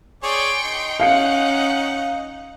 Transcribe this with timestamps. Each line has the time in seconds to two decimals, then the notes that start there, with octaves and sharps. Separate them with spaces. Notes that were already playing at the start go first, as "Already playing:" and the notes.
0.23 G#4 C#5 D5 G5 C6 C#6
0.65 D#4
1.00 C#4 F5 F#5 C7 C#7